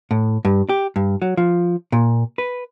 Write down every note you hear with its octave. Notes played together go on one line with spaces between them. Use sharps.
A2
G2
G4
G2
F#3
F3
A#2
B4